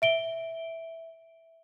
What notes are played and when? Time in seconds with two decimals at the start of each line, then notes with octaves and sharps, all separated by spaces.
0.02 E5 D7 G7